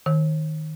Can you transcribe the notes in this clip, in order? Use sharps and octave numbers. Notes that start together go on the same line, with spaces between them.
D#3